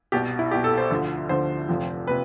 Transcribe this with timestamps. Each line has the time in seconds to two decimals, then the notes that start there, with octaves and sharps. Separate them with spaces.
0.12 C2 B2 G4
0.39 E4
0.51 C2 G4
0.55 B2
0.64 A4
0.78 C5
0.90 D2 D3 F3
1.29 D2 D3 F3 C5
1.68 F1 F2 C3 F3
2.07 C3 B4